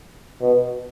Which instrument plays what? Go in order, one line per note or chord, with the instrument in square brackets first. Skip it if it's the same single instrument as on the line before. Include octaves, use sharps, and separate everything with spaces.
[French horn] B2